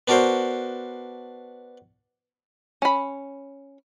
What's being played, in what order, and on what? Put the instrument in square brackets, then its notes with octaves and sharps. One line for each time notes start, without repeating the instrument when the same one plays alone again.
[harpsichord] B3 D4 F#4 A#4 C5
[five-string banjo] C#4 B5